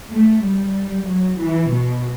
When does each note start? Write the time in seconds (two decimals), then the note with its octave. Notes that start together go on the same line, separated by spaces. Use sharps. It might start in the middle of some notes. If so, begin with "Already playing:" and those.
0.11 A3
0.42 G3
1.06 F#3
1.39 E3
1.70 B2